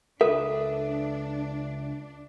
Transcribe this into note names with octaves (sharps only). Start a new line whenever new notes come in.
C#2 D4 A4 B4 E5